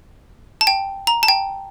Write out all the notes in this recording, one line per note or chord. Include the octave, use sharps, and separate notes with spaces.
A5
G5
A#5
A5
G5